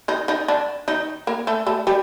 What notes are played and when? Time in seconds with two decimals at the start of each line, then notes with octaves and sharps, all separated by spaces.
0.08 D#3 D#4
0.28 D#3 D#4
0.48 D3 D4
0.88 D#3 D#4
1.27 A#3 A#4
1.47 A3 A4
1.67 A3 A4
1.87 G3 G4